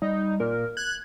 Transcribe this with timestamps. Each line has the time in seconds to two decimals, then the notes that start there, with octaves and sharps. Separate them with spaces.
0.02 G3 D#4
0.40 A#2 A#4
0.77 F#6 G#6